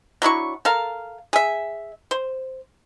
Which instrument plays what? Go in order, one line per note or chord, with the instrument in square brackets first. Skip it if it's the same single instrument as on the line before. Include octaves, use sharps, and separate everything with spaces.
[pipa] F#3 D4 E4 C#6
A4 A#4 F5
G#4 E5
C5